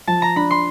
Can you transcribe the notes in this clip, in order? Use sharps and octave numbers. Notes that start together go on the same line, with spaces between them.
F3 A5
A#5
D4 B5
C6